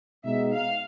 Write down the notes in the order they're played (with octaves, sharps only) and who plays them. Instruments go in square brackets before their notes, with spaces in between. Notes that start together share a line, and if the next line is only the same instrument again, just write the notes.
[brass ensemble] B2 G#3 B3 D#4 [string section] E5
[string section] F5